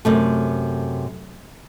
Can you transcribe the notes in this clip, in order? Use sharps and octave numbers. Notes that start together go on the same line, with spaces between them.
F#2 C3 A3